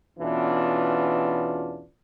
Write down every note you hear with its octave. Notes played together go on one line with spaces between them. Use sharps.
E2 B2 E3 C#4 D4 F4